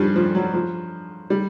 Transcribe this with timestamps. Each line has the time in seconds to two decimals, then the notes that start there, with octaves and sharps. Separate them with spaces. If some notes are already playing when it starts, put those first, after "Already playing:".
Already playing: G2 F3 G3
0.16 F3
0.35 F#3
0.54 F3
1.30 G3